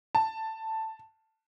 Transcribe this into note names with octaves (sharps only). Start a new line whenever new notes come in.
A5